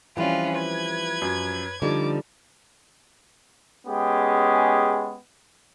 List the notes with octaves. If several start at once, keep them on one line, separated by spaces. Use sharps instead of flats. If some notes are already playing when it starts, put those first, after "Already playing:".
E3 F3 G3 C4 C#4 F4 B4
G#6
F#2
D3 F3 G3 D#4 D6
G#3 B3 C#4 G4 G#4